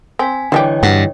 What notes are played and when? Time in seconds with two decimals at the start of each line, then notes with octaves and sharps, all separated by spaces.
0.19 C4 G#5 B6
0.52 D3 E3 G3 D4 G4 C#5 D#5 G5
0.83 G2 F#3